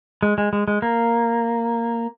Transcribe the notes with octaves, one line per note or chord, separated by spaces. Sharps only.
G#3
G#3
G#3
G#3
A#3